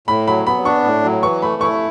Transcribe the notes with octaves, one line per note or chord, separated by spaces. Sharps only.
A2 B5
F#3 B5
B3 B5
D4 C#6
A2
F#3
E3 C#6
A3 B5
E4 C#6